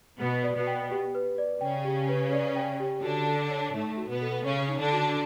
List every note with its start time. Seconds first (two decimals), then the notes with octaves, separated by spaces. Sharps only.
0.19 B2 B3 B4
0.43 D5
0.55 B2 B3
0.67 G5
0.91 G4
1.15 B4
1.38 D5
1.61 C#3 C#4 G5
1.85 G4
2.08 B4
2.33 D5
2.55 G5
2.80 G4
3.03 D3 D4 F#4
3.27 A4
3.50 C#5
3.74 A2 A3 D#4
3.97 F#4
4.10 B2 B3
4.22 A4
4.45 C#3 C#4 C#5
4.68 D#4
4.80 D3 D4
4.93 F#4